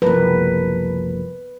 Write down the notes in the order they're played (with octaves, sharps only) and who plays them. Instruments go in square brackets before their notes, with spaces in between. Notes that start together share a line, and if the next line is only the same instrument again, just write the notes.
[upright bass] F#1 C2 [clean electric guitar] F3 A#4 [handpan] B4